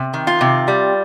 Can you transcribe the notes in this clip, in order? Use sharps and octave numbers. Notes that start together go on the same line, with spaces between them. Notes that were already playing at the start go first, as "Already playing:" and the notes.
Already playing: C3
D#3
F4
C3
G3